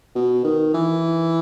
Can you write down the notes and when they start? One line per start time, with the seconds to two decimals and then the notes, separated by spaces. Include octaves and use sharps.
0.15 B2
0.44 D#3
0.74 E3